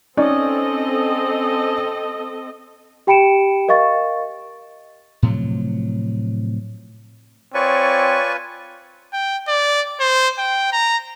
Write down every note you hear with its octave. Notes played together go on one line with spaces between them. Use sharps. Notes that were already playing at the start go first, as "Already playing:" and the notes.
C4 C#4 D#4 A4 D5 D#5
G4 G5 B5 C#7 D7 E7
A#4 D#5 F5 C#6 A6
A2 C3 F3 F#3
C4 F4 B4 C#5 D5 G#5 C#6
G5
D5
C5
G5
A#5